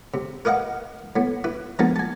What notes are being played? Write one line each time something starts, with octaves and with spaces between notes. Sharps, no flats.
C3
A#4 B4 D#5 F5 F#5
A2 B3
E4 B4
F3 G#3 A#3 B3 D#4 A5
G#5 A5